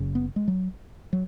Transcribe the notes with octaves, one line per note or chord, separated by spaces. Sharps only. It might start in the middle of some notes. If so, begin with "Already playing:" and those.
Already playing: F#1 F#2 C#3
B3
G#3
F#3
F#3